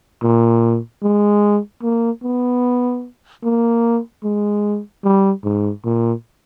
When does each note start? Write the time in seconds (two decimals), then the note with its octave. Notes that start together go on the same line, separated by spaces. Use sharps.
0.23 A#2
1.03 G#3
1.83 A#3
2.23 B3
3.44 A#3
4.24 G#3
5.04 G3
5.44 G#2
5.85 A#2